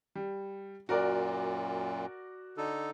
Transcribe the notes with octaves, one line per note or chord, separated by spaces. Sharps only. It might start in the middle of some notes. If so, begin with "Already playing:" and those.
G3
F#2 A#2 F#4 A#4 D5
D3 D#4 A4